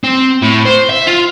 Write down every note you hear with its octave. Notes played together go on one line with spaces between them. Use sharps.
C4
A2
C5
E5
F4